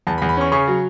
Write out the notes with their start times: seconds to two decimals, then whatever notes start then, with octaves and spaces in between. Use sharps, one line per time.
0.07 E2 A5
0.18 B5
0.22 E2
0.29 B5
0.37 C#4 C#6
0.52 C#3 C#6
0.68 F#3